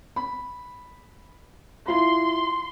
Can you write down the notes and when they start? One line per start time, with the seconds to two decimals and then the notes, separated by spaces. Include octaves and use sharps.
0.16 B5
1.88 E4 F4 C6